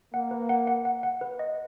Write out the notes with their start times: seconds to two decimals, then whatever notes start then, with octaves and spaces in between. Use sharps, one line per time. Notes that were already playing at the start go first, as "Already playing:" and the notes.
0.13 A#3 F#5
0.31 B4
0.49 F#5
0.67 F#5
0.85 F#5
1.03 F#5
1.21 B4
1.39 D#5